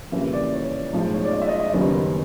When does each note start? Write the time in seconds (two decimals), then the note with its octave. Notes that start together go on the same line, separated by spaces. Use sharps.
0.12 F2 C#3 E3 G3 A#3 E5
0.33 D5
0.54 C#5
0.93 B1 A2 F3 G#3
1.14 C#5
1.24 D5
1.33 D#5
1.42 E5
1.48 D#5
1.60 E5
1.73 F#1 F#2 D#3 G3 B3